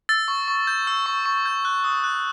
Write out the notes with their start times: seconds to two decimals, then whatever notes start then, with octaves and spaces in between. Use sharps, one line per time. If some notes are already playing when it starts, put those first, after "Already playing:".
0.09 E6 A6
0.28 C#6
0.48 C#6
0.67 G6
0.87 E6
1.06 C#6
1.26 C#6
1.45 G6
1.65 F#6
1.84 D#6
2.04 F#6